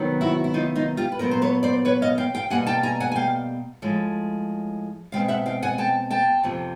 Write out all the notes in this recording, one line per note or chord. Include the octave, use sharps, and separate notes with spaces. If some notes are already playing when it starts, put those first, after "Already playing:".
Already playing: C3 D#3 F#3 B3
E4 F#4
E4
D#4 F4
D#4 F4
F4 G4
B4
A#2 F#3 B3 A#4 C5
C5
B4 C#5
C5 D5
B4 C#5
D#5 F5
F5 G5
F5 G5
B2 G3 A#3 F#5 G#5
G5 A5
G#5 A#5
F#5 G#5
G#5
F5 G5
A2 F3 G#3
B2 G#3 C4 F5 G5
E5 F#5
F5 G5
F#5 G#5
G5 A5
G5 A5
F2 C3 F3